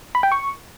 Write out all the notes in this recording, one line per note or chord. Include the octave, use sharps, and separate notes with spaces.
B5
G5
C#6